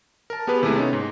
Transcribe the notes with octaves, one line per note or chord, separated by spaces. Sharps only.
A#4 A5
B3 G4 G#4 B4
D#2 C3 G#3 A3 E4 G#4
B3 C#4 D#4
G#2